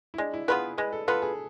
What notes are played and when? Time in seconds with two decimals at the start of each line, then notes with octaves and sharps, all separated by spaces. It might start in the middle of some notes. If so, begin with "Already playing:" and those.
0.14 E4
0.18 G#3 D4
0.33 E4
0.48 B3 F4 G#4 B4
0.78 G#3 B4
0.93 A4
1.08 B3 F4 A4 B4
1.22 G#4